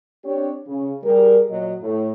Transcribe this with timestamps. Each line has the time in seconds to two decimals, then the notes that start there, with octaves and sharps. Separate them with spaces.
0.24 C4 D4 G4 C#5
0.66 C#3
1.02 G3 G4 G#4 A#4
1.49 A#2 F#3 D#5
1.81 A2